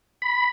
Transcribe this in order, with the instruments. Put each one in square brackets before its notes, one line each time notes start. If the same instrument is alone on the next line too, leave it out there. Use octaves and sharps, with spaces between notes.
[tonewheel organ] B5